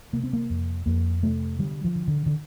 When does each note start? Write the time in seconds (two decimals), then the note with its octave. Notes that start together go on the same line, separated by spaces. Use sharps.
0.13 C3 A#3
0.23 C4
0.33 A#3
0.50 F2
0.86 F2 A#3
1.23 C3 A3
1.59 D3 G3
1.84 F3
1.95 D3
2.08 D3
2.26 D3